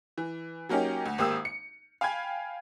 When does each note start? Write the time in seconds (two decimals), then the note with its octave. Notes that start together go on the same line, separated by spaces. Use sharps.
0.18 E3
0.69 F#3 A#3 C#4 D#4 G4
1.06 D2
1.18 G#1 A#3 G4 D#6 E6
1.45 C#7
2.01 F5 G5 G#5 B5 G#6